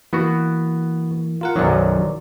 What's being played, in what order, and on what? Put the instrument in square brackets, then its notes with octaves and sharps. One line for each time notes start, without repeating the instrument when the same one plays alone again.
[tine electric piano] E3 A#3 [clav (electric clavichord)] B3 F#4
[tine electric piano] F4 A#4 F#5
[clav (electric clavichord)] B1 F#2 F#3 [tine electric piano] D#3 C5 D5